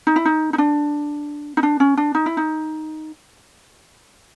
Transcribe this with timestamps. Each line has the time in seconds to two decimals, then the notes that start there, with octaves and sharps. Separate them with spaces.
0.07 D#4
0.16 E4
0.25 D#4
0.53 D#4
0.58 D4
1.57 D#4
1.63 D4
1.80 C#4
1.97 D4
2.15 D#4
2.26 E4
2.37 D#4